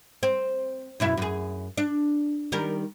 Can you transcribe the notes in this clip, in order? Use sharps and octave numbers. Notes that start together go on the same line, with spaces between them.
C4
F#2 B2 E4
F#2 G#4
D4
D#3 G3 A#4